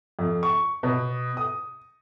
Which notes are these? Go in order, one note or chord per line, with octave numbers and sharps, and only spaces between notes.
F2
C#6
B2
D#6